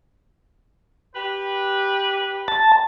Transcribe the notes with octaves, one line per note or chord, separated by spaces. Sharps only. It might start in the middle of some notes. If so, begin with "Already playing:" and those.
G4 B4
A5